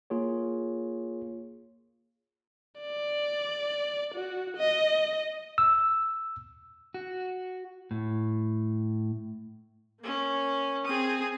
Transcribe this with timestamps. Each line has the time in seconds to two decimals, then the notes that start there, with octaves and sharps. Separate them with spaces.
0.10 A#3 F4 G#4 C#5
2.81 D5
4.15 F#4
4.57 D#5
5.58 E6
6.94 F#4
7.91 A2
10.00 A#3 C#4
10.86 C4 G#4 G#5 D#6